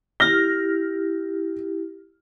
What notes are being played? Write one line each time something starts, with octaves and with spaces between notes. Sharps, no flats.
E4 G4 F6 A#6